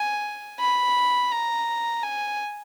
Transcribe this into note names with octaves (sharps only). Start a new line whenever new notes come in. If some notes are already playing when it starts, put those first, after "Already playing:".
Already playing: G#5
B5
A#5
G#5